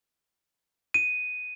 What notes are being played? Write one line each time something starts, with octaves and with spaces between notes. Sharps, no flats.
D#7